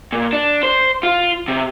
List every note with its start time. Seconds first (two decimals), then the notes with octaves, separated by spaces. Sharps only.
0.12 A#2
0.33 D4
0.63 C5
1.03 F4
1.48 C3